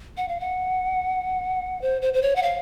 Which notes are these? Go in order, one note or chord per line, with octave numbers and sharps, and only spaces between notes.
F#5
F5
F#5
C5
C5
C5
C#5
F#5
F5